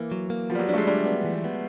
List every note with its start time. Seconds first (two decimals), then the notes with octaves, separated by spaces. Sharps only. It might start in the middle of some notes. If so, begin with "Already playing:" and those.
Already playing: E3 A#3
0.12 F#3
0.30 A#3
0.50 F3 B3
0.55 G3
0.59 F#3
0.69 G3 D4
0.74 A3
0.78 G#3
0.87 G3 D4
1.06 B3
1.25 E3
1.44 B3